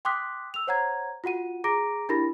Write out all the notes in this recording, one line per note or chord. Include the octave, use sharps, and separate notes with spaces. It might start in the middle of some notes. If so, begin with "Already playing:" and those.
G5 C6 D6 D#6 F#6 B6
E6 F7
C5 C#5 F#5 A#5 G#6
F4 F#4 F#5 D#7
G#4 A#5 D6 A#6 D7
D4 E4 G4 A#4 B5 A#6